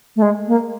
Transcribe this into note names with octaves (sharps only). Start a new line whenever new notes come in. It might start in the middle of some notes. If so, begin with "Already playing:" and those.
A3
G#3
A#3